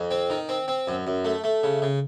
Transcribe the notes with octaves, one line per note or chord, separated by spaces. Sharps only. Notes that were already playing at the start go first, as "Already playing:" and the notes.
Already playing: F2
C4
D#3
C4
C4
F#2
F#2
A3
A3
C#3
C#3